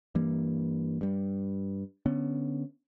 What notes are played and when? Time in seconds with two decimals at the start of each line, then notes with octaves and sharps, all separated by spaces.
0.15 G2 E3 A#3
1.01 G2 G3
2.06 D3 B3 C#4